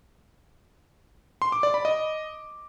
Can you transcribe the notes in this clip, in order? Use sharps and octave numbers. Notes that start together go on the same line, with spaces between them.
C6
D6
D5
B5
D#5